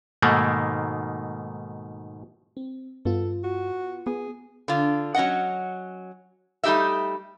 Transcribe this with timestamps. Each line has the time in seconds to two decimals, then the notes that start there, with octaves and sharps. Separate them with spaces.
0.22 G#2 B2 D#3 A3 A#3
2.57 C4
3.05 G2 B3 F4 A4
3.44 F#4
4.07 B3 G#4
4.68 D3 F4
5.14 F#3 C#4 D#5 F#5
6.63 G3 A3 D#4 G4 D#5 E5